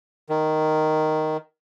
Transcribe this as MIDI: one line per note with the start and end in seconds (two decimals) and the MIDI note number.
0.29 1.37 51